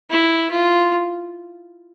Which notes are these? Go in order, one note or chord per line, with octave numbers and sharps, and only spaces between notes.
E4
F4